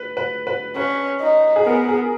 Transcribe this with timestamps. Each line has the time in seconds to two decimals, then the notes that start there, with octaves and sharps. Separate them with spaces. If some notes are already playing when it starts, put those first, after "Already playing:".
Already playing: B4
0.17 B4
0.47 B4
0.76 C#4 B4
1.21 D#4
1.56 G#4
1.66 B3 A#4
1.88 G#4